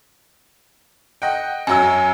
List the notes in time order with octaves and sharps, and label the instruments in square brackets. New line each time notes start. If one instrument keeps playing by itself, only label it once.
[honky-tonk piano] D#5 F#5 G5
[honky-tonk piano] F#2 F#3 E6 [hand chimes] G#5